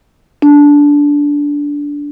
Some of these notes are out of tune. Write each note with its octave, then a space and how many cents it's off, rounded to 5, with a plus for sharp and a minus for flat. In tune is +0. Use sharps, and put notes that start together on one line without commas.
D4 -15